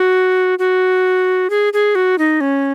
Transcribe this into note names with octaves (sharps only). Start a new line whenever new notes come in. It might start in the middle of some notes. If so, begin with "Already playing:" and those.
Already playing: F#4
F#4
G#4
G#4
F#4
D#4
C#4